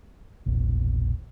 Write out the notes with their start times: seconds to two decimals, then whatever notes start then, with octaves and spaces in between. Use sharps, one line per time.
0.46 E1 A#1